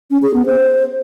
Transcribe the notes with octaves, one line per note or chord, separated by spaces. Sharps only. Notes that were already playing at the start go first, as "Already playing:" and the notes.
C#4
G#4
B3
C5